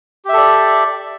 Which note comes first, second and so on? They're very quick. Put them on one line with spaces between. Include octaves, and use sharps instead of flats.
G4 E5 A4 D5